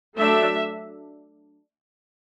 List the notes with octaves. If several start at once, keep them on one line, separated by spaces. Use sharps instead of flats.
F#3 A3 D4 E5